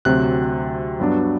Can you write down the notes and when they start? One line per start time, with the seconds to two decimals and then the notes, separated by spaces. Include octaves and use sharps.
0.05 D2 C3 F#3 C4 F#6
1.00 G2 F#3 B3 D4